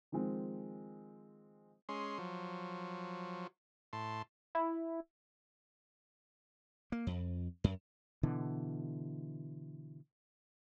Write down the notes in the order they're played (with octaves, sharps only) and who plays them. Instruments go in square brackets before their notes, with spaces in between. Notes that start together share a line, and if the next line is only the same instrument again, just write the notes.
[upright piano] D#3 F3 G#3 C4
[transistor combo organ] G#3 C#4 C6
F3 F#3
A2 A5 C6
[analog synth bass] E4
[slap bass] A#3
F2
F#2
[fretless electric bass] B2 D3 E3